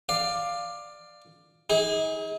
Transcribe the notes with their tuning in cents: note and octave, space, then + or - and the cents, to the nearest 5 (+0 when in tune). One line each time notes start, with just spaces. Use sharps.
D5 +15 F5 +0
D#4 +40 G#4 -20